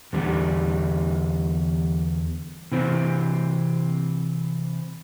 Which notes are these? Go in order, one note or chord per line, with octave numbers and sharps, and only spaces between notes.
E2 D3 G3
C3 E3 C4